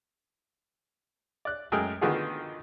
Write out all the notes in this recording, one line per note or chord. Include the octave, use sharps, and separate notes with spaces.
D5 F#6
F#2 G#3 A3 A#4 G5 D#6
D3 D#3 B3 F4 F#4 G#4